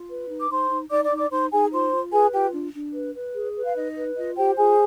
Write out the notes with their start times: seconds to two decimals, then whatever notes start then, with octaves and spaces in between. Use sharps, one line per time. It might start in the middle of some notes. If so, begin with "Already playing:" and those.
Already playing: F4
0.09 B4
0.29 D#4
0.40 D6
0.49 D#4 C5 C6
0.70 D#4
0.90 D#4 D5 D6
1.03 D5 D6
1.11 D#4
1.17 D5 D6
1.31 D#4 C5 C6
1.51 D#4 G#4 G#5
1.71 F4 C5 C6
1.92 F4
2.12 G#4 B4 G#5
2.32 F4 G4 G5
2.53 D4
2.74 D4
2.94 B4
3.14 B4
3.35 G#4
3.55 B4
3.65 F5
3.75 D#4 D#5
3.96 B4
4.16 F4 D#5
4.36 G4 C5 G5
4.57 F4 G#4 G#5